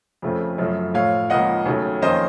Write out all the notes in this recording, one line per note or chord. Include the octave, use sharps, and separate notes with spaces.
F2 C#3 F3 A3 C4
F#2 C#3 F3 A3 C#4
A2 F3 A3 C#5 F5
C#2 C#3 F3 A#3 D#5 F#5
D#2 C#3 F#3 A3
F2 D#3 A#3 C#4 C5 D#5